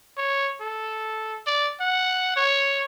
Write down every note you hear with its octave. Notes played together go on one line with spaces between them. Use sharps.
C#5
A4
D5
F#5
C#5